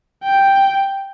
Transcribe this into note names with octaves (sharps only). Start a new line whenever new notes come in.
G5